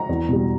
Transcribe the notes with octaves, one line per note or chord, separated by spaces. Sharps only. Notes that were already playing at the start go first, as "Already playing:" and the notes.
Already playing: A#5
E2
B2 G3